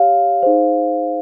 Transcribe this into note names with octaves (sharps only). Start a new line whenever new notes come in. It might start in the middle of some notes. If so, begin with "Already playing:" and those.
Already playing: G4 C#5 F5
D#4 G#4 C5